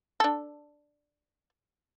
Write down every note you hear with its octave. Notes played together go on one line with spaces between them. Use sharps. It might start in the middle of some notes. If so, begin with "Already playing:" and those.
D4 A4